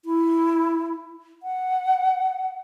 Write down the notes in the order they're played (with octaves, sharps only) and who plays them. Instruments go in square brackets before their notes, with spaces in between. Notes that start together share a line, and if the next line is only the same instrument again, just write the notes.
[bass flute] E4
F#5